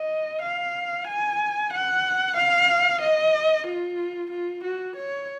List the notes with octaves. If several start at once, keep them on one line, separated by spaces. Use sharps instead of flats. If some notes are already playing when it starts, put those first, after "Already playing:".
Already playing: D#5
F5
G#5
F#5
F5
D#5
F4
F4
F#4
C#5